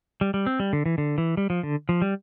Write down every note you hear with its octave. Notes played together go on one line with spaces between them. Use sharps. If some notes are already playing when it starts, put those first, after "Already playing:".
G3
G3
C4
G3
D3
E3
D3
E3
G3
F3
D3
F3
G3